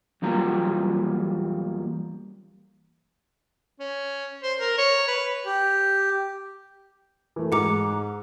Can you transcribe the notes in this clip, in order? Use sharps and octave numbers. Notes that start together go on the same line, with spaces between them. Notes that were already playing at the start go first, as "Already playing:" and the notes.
E2 F#3 G3 A#3 F4 A#5
C#4
C5
A#4
C#5
B4
G4
E3 A3
G#2 A#5 D6 C#7